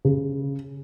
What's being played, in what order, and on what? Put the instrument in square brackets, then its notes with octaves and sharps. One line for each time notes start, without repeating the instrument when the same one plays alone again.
[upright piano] C#3